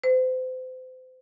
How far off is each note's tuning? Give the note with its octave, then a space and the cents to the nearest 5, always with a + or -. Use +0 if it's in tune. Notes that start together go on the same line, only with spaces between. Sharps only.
C5 -35